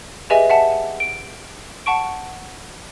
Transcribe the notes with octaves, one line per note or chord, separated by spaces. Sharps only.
G4 G#4 B4 D#5 E5 G#5
E5 F#5 A5
D7
F#5 A5 C#6 D7